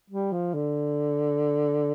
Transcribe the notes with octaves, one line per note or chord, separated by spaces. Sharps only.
G3
F3
D3